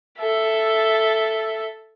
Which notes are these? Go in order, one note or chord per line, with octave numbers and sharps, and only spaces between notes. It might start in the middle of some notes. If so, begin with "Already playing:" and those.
A4 E5